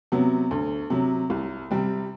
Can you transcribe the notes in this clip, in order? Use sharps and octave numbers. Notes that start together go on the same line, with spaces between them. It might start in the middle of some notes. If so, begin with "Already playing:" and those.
C3 F#3 B3
D2
C3 F#3
C2
C3 G3 C4